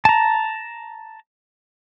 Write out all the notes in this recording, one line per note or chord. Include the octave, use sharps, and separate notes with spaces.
A5 A#5